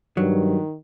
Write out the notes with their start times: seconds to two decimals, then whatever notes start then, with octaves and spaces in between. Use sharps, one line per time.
0.17 G2 D#3 F#3